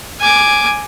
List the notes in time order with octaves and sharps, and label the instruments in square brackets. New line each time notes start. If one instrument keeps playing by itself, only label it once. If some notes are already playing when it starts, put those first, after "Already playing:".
[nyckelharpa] G#5 D6